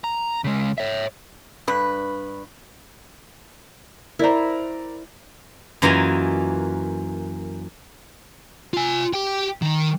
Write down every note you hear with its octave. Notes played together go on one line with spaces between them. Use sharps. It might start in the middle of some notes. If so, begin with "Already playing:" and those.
A#5
C#3 G#3
C#5 E5
G2 B4
E4 A#4 C5 D5 A#5
F#2 E3 A#3 F4 D#5 G#5
F4 G#5
G4 G5
D#3